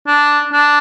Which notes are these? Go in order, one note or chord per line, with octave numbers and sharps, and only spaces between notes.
D4
D4